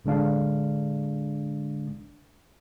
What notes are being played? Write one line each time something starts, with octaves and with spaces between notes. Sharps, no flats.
A1 D3 G#3 D4 F5